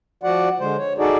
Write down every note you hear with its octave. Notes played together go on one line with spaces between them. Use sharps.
F3 F#4 D5 F#5
D3 G#3 C5
C#5
D#4 F#4 G#4 A4 D5